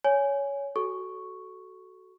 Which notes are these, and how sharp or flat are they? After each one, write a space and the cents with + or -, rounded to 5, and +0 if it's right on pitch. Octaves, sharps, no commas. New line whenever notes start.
C#5 +15 G#5 +0
F#4 +10 A4 -15 C#6 +0